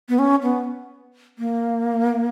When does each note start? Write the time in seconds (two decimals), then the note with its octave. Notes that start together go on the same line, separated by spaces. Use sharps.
0.09 B3
0.19 C#4
0.42 B3
1.38 A#3